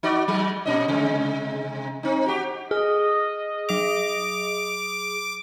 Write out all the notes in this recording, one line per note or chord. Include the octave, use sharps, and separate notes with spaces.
D#4 F#4 D5
F#3 G#3
A#2 C#4 D#5
C3 G#3
C4 D#4
F#4 G4
G#4 D#5 F6
F#3 D6 D#6 F7